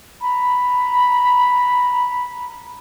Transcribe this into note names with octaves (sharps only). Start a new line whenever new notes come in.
A#5 B5